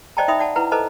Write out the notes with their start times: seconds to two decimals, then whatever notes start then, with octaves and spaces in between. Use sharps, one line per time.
0.17 C5 D5 D#5 G5 A5 A#5
0.28 D#4 E5 G5 B5 D#6
0.39 D5 F#5 A5
0.56 E4 B4 F#5 A#5
0.71 A4 B4 C5 D#5 A5 A#5